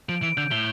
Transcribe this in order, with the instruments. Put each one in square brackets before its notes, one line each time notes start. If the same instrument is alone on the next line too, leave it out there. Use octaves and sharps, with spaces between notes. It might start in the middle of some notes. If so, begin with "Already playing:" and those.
[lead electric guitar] F3 [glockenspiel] D7
[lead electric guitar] E3 [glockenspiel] D7
[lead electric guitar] D3 [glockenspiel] G6
[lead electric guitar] A2 [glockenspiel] G7